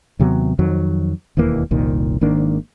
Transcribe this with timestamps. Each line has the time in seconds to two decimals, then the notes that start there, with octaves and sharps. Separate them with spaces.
0.19 D#2 C3 F#3 B3
0.59 F2 D#3 F#3
1.37 E1 D#2 E3 A#3
1.71 F1 C2 A#2 D#3
2.21 G#1 D#3 A#3 D4